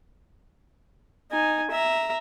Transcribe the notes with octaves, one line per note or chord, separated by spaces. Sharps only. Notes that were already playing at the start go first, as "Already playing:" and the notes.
D#4 G#5
E5 A#5